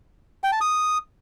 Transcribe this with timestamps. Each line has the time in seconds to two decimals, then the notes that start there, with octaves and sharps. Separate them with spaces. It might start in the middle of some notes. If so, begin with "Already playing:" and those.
0.44 G5
0.52 A5
0.61 D#6